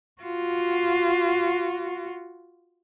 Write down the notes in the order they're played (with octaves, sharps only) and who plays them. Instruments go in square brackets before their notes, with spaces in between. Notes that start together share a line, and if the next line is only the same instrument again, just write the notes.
[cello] F4 F#4